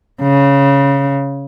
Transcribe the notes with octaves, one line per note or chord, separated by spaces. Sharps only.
C#3